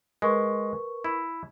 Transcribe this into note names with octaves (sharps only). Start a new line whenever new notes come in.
G#3 A#4 B4 C#6
E4